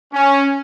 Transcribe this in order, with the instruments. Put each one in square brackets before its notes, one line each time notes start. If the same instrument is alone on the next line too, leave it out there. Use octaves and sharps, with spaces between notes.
[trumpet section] C#4